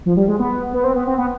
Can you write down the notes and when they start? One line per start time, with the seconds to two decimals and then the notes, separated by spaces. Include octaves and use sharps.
0.06 F3
0.17 G3
0.28 G#3
0.39 B3
0.73 B3
0.84 C4
0.96 B3
1.07 C4
1.18 B3